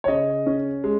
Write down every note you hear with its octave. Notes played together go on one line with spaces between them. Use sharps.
C#5
C#3 D#5
C#4
G#3